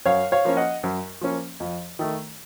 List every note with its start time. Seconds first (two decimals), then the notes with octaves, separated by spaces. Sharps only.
0.05 F#2 C#5 F5
0.32 C#5 F5
0.45 F3 A#3 C#4
0.57 D#5 F#5
0.83 F#2
1.21 F3 A#3 C#4
1.60 F2
1.99 D#3 A3